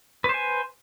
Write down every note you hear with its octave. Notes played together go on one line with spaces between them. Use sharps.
B4 C5 G#5